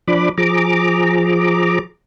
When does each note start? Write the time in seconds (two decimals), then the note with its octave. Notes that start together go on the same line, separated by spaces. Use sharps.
0.08 F3 D4 B5 D6
0.38 F3 G#4 A#5 D6